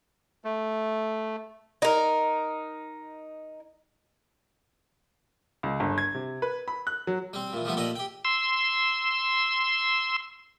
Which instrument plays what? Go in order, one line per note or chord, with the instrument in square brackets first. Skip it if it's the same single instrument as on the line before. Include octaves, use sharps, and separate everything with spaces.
[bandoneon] A3
[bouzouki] D#4 A#4
[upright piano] C#2
G1
G#6
C3
B4
B5
F#6
F#3
[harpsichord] G3 C4
A#2 E3
F3 G3 A3 B3
A#2 G4 A4 D5 D#5
G4 G5
[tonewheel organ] C6 E6